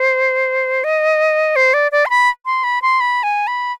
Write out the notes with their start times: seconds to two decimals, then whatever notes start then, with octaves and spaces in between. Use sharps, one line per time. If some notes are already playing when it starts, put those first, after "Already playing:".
Already playing: C5
0.84 D#5
1.56 C5
1.74 D5
1.92 D5
2.06 C6
2.10 B5
2.46 C6
2.64 B5
2.82 C6
3.00 B5
3.23 G#5
3.47 B5